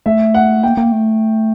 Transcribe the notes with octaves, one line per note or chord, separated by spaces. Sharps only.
A3 E5
F#5
A#3 G5
A#3
A3